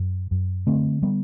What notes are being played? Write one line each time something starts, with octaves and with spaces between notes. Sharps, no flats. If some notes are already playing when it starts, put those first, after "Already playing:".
Already playing: F#2
F#2
D3 A3 C4
G3 B3